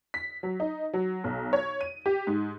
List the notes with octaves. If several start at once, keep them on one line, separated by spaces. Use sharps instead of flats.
B6
F#3
D#4
F#3
B1
C#5
D#7
G4
G#2